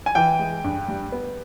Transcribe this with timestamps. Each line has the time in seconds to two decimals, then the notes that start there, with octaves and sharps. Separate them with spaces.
0.06 G#5
0.15 E3 G5
0.39 G#3
0.64 G2
0.88 G3
1.12 B3